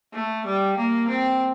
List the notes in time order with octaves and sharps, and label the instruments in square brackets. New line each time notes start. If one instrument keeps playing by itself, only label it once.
[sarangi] A3
G3
A#3
C4